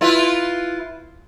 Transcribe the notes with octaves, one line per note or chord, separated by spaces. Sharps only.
E4 F4 B4